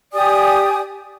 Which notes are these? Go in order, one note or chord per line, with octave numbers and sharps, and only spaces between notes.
G4 D5 G#5 D#6